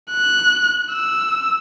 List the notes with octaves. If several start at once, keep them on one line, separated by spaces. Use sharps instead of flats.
F#6
E6